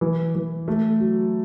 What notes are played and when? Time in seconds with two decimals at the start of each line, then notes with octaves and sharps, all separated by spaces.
0.01 E3
0.35 E3
0.68 A3
1.00 F#3